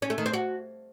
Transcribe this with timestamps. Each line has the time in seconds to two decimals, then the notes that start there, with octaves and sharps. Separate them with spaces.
0.02 C#4
0.10 A3
0.18 D#3
0.26 C4
0.33 F#4